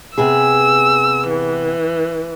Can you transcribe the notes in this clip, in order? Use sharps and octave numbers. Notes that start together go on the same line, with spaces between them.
C3 B3 G#4 E6
E3